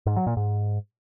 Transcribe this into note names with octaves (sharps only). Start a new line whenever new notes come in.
G#2
F#3
A#2
G#2